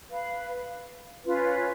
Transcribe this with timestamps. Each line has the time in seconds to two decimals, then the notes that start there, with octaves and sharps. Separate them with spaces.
0.09 B4 F5 B5
1.24 C#4 F4 B4